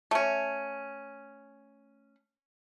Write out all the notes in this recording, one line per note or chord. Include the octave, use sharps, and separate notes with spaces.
A3 C#4